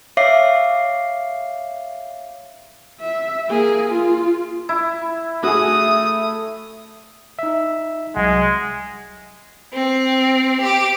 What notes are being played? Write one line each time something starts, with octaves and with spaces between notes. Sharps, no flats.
C#5 E5 F5 D6 C7
E5
A#3 G#4
F4
E4
A3 F#4 G#4 D#6
D#4 E5
C2 F#3 G#3 F#5
C4
G4 D6